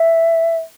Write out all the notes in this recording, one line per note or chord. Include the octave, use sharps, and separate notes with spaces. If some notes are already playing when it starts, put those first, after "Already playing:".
Already playing: E5